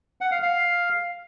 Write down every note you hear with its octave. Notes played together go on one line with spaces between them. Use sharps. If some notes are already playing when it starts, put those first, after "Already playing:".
F#5
F5
F5